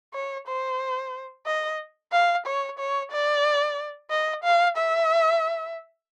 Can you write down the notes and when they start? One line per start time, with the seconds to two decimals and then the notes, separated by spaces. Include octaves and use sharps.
0.14 C#5
0.48 C5
1.47 D#5
2.13 F5
2.47 C#5
2.79 C#5
3.12 D5
4.11 D#5
4.44 F5
4.78 E5